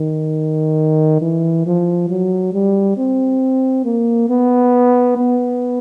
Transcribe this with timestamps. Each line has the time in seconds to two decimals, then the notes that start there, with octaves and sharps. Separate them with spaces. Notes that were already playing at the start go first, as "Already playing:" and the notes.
Already playing: D#3
1.22 E3
1.66 F3
2.10 F#3
2.54 G3
2.98 C4
3.85 A#3
4.29 B3
5.17 B3